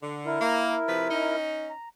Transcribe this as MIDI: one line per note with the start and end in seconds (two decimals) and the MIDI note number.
0.03 0.37 50
0.26 1.36 64
0.26 1.36 70
0.41 0.76 58
0.88 1.09 48
0.88 1.09 53
0.88 1.09 71
1.11 1.71 61
1.11 1.71 63
1.70 1.89 82